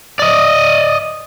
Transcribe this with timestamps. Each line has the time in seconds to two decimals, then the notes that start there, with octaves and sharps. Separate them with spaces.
0.19 D5 D#5